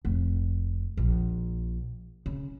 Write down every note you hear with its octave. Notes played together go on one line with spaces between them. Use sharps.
F1
A#1
C#3